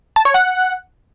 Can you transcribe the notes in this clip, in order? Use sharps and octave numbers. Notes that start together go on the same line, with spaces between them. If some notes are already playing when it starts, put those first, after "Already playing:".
A5
C#5
F#5